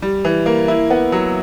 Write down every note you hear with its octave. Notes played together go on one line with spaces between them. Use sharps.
G3
E3
A#3
E4
B3
F#3